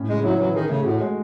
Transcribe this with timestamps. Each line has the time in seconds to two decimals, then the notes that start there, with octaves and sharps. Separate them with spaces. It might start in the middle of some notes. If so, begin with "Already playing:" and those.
Already playing: A2 C#4
0.09 C#3 G#3
0.23 F#3 E4
0.39 E3 F#3
0.55 D#3 G#4
0.69 C#3 A3
0.85 A2 F#4
1.00 G#3